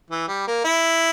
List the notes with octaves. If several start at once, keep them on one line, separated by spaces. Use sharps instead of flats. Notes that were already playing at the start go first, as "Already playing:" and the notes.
E3
G3
A#3
E4